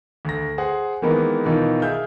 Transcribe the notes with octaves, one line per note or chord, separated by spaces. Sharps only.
D2 A#6
G#4 C5 F#5
D#3 E3 G#3 A#3 B3 D#4
B2 D#3 E3 D#4 F4
G#4 E5 F5 F6 G6